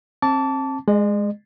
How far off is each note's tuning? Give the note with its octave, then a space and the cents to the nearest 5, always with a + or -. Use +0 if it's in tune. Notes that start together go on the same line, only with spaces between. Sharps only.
C4 +35 A5 +0 D6 -30
G#3 +0 D#5 -45